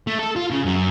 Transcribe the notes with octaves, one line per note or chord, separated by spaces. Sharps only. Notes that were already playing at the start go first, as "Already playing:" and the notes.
A3
A4
F4
C#3
F#2